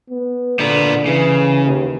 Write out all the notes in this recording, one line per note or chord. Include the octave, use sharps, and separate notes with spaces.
B3
A#2 D3 B3
C#3 E3
D#2